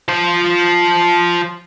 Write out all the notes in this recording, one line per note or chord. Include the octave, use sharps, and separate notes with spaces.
F3 C5